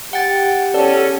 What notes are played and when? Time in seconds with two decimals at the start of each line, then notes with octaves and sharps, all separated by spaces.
0.13 G4 F#5 G5 A6
0.74 E2 C#4 A4 D5